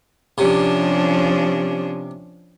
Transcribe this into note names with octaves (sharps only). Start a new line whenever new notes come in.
C3 F3 C#4 D4